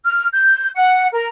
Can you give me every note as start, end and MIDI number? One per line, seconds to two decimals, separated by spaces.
0.04 0.25 89
0.33 0.68 91
0.75 1.07 78
1.12 1.27 70